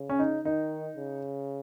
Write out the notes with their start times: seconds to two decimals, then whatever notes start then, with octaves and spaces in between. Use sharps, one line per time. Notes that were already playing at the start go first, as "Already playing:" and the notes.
Already playing: C#3
0.09 C#4
0.19 D#4
0.45 D#3 D#4
0.97 C#3